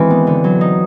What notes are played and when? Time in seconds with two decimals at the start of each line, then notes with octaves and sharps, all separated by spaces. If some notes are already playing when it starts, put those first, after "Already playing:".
Already playing: D#3 E3 G#3 C4
0.10 B3
0.27 D3
0.44 F#3
0.61 D#4